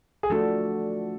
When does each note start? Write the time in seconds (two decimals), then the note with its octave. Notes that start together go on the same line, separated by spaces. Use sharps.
0.23 G#4
0.30 F3 A3 D4 F#4 A4